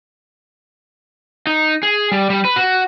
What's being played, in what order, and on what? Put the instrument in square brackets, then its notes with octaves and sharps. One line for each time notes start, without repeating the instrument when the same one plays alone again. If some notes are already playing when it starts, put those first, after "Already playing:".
[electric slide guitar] D#4
G#4
G3
G3
B4
F#4